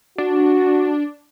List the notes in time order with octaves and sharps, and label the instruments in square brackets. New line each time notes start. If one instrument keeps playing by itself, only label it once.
[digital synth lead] D4 [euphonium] F#4